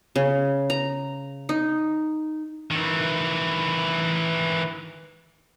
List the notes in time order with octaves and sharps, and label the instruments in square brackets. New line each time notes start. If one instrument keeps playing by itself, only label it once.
[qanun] C#3
A#5
D#4
[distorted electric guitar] D#3 E3